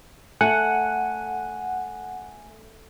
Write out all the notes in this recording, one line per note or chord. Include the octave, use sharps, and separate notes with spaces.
A3 F#5 G#5